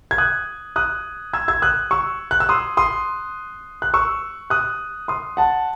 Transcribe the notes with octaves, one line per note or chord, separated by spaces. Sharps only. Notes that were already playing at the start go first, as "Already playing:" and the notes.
G#6
D#6 F#6
D#6 F#6
E6 G#6
E6 G#6
D#6 F#6
C#6 E6
F#6
E6
C6 D#6
C6 D#6
F#6
C#6 E6
D#6 F#6
C6 D#6
F#5 A5